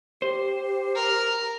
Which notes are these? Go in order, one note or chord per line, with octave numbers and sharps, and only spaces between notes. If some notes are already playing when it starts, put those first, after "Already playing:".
G4 C5
A#4